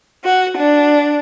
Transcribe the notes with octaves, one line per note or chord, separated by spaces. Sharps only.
F#4
D4